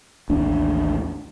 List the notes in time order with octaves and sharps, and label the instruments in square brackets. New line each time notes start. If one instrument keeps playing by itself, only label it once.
[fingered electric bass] A1 D#2 D4